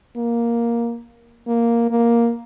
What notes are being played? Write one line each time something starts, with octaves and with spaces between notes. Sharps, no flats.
A#3
A#3
A#3